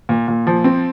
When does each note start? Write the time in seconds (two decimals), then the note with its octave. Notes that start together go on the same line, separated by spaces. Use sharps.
0.09 A#2
0.28 A#2
0.47 F3
0.64 C4